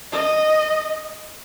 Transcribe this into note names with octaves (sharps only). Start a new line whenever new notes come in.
D#5